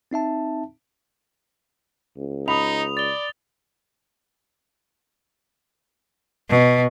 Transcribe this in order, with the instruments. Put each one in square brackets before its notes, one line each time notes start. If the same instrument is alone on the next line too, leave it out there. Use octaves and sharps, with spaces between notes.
[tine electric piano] C4 D#4 E5 A5
[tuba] C#2
[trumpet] D#4 [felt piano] B5 [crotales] D#6 F7
[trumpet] D5 [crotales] A6 G7
[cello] B2